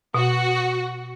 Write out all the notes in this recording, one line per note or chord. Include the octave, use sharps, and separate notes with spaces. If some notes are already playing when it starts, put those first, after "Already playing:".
B2 F#4